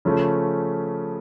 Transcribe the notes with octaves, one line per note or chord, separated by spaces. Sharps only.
C#3 F3 A3 C#4